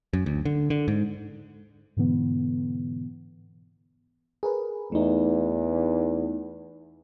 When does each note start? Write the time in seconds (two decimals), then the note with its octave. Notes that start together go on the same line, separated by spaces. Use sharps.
0.13 F#2
0.26 D2
0.45 D3
0.70 D3
0.88 G#2
1.97 G#2 B2 D3 E3 B3
4.43 G#4 A#4 B4
4.92 E2 A3 D#4